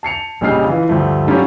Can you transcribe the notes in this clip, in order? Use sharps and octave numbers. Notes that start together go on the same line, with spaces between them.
A5 C7 C#7 F7
A#1 C#3 G3 D#5 F6 C7
E3 F4
D2 G2 F3 A3
F#3 G3 C#4 F4